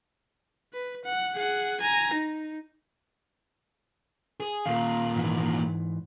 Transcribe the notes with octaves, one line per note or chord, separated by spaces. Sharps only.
B4
F#5
G#4 F#5
G#5 A#5
D#4
G#4
D#2 A#2 F5
G#2 E3